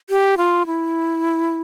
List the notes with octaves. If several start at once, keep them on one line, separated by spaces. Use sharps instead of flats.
G4
F4
E4